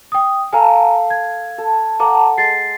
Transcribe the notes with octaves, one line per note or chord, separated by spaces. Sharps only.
G5 D#6
A4 F5 G5 G#5 A#5
G#6
A4
A4 F#5 A5 A#5 D6
G#3 A6 C7